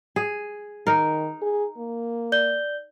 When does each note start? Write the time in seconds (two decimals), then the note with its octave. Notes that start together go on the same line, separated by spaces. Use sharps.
0.16 G#4
0.87 D#3 D#4 A#4
1.42 G#4
1.78 A#3
2.32 D5 G6 G7